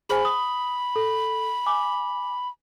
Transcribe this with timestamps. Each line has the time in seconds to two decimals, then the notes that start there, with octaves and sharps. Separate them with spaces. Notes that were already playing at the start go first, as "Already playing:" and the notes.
0.09 G#4 C5 G#5 B5
0.25 D#6
0.96 A4
1.66 G#5 D6